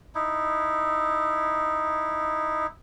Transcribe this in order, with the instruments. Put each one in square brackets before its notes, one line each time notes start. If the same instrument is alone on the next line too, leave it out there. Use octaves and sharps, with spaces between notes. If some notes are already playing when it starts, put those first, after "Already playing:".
[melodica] D#4 E4